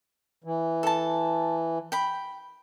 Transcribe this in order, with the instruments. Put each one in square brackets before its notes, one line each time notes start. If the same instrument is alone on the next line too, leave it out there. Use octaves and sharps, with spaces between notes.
[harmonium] E3
[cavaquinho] A4 A5
G5 B5